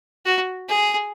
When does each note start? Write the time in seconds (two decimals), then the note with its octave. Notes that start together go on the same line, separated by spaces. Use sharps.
0.26 F#4
0.69 G#4